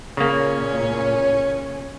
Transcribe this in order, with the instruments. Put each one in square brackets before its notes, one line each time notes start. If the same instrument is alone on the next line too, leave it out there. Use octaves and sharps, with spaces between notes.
[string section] A#2 [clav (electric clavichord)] C#3 A#3 [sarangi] C#4